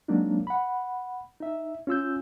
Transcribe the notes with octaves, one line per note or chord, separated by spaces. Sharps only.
F#3 G#3 A#3 C4 D4 D#4
F#5 B5
D#4 E5
C#4 F4 E6 G6